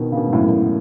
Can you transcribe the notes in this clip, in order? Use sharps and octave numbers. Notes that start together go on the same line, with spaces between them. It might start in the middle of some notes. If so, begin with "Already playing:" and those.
Already playing: B2 D#3
C#3
B2 D#3
G#2
F#2 A2
F#2 A2